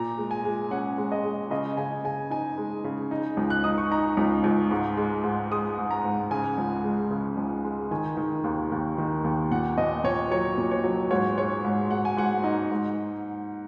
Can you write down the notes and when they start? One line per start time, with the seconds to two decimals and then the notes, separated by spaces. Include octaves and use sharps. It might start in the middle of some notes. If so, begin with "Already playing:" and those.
Already playing: A#2 A#5
0.18 G#3
0.31 G#5
0.45 G#3
0.71 C#4 F#5
0.98 G#3
1.12 D#5
1.24 G#3
1.51 C#3 D#5
1.77 C#3 G#5
2.04 C#3 G#5
2.30 D#4 G#5
2.58 G#3
2.84 C#3
3.11 D#4
3.37 C#2
3.50 F#6
3.64 D#4 D#6
3.78 C#6
3.91 D#4 A#5
4.17 C#2
4.44 C#2
4.71 G#2
4.97 G#3
5.24 G#2
5.51 G#3 D#6
5.78 G#2
5.91 A#5
6.04 G#2
6.31 C#3 G#5
6.58 C#2
6.84 G#3
7.11 C#3
7.37 C#2
7.64 G#3
7.91 D#3 G#5
8.17 D#3
8.44 D#2
8.72 D#2
8.98 D#3
9.24 D#2
9.51 A#2 F#5
9.78 A#2 D#5
10.04 A#2 C#5
10.31 F#3 C#5
10.58 A#2
10.71 C#5
10.84 F#3
11.10 G#2 C#5
11.38 G#3 C#5
11.65 G#2
11.91 G#2 F#5
12.05 G#5
12.17 G#2 F#5
12.44 D#4
12.72 G#2